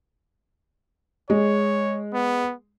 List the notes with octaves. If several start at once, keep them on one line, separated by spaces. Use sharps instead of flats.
G#3 C#5
B3